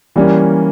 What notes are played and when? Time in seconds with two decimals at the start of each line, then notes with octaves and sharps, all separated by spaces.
0.16 E3 G3 A#3 C#4